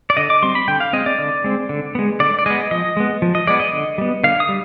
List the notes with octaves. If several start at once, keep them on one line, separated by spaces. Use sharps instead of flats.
D5
D3 D#5
D6
G3 C4 C6
B5
D3 G5
F5
G#3 C4 D#5
D5
D3
G#3 C4
D3
G#3 B3
D3 D5
D5
G#3 B3 D#5
F3 D#5
G#3 B3
F3
D#5
G#3 B3 D5
D#5
D3
G3 B3
D3 F5
D#6
G3